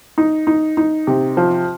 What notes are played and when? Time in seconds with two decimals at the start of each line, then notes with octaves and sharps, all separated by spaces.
0.18 D#4
0.47 D#4
0.77 D#4
1.07 C3
1.37 F3